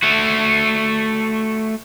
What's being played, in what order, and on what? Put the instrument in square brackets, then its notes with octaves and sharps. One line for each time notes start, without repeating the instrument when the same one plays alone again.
[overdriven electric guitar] A3 F#4